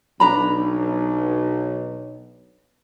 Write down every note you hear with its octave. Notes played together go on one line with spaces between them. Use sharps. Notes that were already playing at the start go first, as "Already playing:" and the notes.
B1 D4 A#5 B5